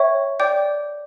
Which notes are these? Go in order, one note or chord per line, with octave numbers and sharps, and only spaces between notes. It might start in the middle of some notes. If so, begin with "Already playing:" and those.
Already playing: C#5 E5 G5 C#6
D5 G5 D6 G6